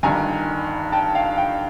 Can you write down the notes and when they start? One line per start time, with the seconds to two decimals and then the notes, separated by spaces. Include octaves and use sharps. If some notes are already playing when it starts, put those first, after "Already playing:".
0.03 G1 G2 D#3 G#5 A#5
0.92 G5 A5
1.15 F5 G5
1.37 F5 G5